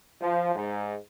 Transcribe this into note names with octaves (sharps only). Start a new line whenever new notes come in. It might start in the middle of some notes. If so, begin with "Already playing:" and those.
F3
G#2